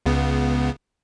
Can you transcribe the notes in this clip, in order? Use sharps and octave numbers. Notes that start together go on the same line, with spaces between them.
C#2 C#3 B3